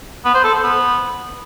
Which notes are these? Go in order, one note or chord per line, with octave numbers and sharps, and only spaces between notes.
B3
C5
A4
C5
B3